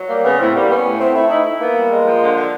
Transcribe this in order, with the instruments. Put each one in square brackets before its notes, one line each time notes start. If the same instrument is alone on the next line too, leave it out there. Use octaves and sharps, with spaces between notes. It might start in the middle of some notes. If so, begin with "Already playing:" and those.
Already playing: [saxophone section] F#3
[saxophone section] G3 [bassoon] A#3
[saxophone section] C#3 [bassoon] B3
[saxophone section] A2 [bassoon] C4
[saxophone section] G3 [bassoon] A#3
[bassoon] B3 [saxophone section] C#4
[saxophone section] A2
[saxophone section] A3 [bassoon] C4
[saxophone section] A3 [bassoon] E4
[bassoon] D#4 [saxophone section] E4
[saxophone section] E4
[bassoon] A#3 [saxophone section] B3
[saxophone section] G3
G#3
F3
D3
D3